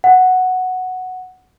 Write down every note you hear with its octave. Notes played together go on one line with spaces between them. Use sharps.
F#5